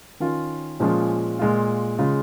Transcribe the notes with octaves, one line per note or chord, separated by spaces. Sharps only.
D#3 C#4 F4
A#2 F3 G#3 C#4 F4
A#2 G#3 F4
C#3 G#3 F4